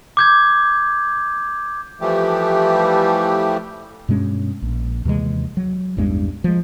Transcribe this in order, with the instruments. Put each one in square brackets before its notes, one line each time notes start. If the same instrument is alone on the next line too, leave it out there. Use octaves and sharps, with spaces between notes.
[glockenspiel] D6 G6 G#6
[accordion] E3 F3 G3 A3 G4
[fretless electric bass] G2 B2 G#3 C#4
A#1
D#2 C3 E3 G#3
F#3
A1 E2 G2 G#3
F3 G#3